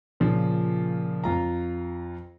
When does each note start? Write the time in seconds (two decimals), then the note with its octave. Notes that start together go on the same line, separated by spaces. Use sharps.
0.20 A#2 C#3 F3
1.24 F2 F4 A#5